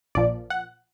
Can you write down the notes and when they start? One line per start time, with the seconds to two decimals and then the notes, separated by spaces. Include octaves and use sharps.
0.15 A#1 A#2 F3 D5
0.50 F#5